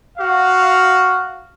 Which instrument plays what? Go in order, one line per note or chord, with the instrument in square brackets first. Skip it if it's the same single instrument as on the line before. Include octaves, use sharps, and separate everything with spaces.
[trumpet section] F#4 F5